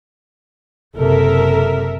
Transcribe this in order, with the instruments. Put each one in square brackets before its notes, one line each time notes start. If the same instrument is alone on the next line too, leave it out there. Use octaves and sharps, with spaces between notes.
[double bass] F#1 C3 [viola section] A4 A#4 E5